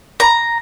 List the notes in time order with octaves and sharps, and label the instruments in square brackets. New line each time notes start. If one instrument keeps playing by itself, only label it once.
[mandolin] A#5